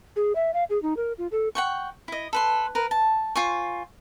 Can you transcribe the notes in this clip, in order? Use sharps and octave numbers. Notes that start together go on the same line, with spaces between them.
G#4
E5
F5
G#4
D#4
A#4
F4
A4
F#5 G5 C#6
E4 D#5
A4 B4 C6
A#4 B4
A5
F4 C5 G#5 C#6